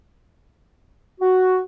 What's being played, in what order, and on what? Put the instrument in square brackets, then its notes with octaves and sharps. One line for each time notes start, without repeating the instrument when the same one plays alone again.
[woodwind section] F#4